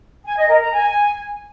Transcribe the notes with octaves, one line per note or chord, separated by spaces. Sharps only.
G#5
D#5
A#4
A#5
G#5